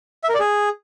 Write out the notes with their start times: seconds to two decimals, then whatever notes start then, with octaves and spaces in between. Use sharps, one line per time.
0.24 E5
0.29 A#4
0.34 D5
0.40 G#4